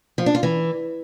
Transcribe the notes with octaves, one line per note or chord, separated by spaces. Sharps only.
F3
D4
F4
E3